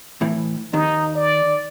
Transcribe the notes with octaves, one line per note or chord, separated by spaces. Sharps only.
A2 E3
D#2 D#3 D#4
D5